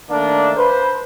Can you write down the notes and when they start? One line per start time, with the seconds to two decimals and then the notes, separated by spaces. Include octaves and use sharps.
0.10 D#3 A3 A#3 D4
0.57 B4 C5